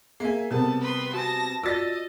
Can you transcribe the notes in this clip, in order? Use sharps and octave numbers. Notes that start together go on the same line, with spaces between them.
A#3 G#4 E5 G#5
C3 G3 B3 A#4 A5
B4 C6
F#4 G#5 A5 A#6
F4 F#4 D5 D#5 E6 A6 A#6